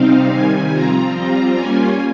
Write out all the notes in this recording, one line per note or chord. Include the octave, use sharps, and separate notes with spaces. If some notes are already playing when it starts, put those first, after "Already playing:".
Already playing: C3 G3 C4 D#4 F5
C3 D#3 G3 G#5
F3 C4 F4 A#5
G3 C4 F4 A#5
G3 A#3 C#4 F4 G#5